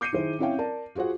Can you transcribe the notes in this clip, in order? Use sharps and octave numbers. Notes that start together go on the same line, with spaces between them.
D6 G6 C7 C#7 D#7
D#3 E4 G#4 C5
C4 C#4 E4 C#5 F5 G5
A#4 D5 A5
F4 F#4 G#4 C5 F#5